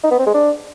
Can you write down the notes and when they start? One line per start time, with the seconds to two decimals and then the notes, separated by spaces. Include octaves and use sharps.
0.04 D#4
0.11 B3
0.19 C4
0.26 G#3
0.34 D4